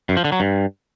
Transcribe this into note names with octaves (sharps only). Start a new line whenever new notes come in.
F#2
F3
D3
F#3
G2